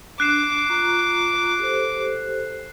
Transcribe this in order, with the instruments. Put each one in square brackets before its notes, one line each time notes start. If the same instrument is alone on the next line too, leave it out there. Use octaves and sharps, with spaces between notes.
[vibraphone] D4 [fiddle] D6 [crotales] F#6 C7 E7
[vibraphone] F4 A#5 C#6
G4 A4 C5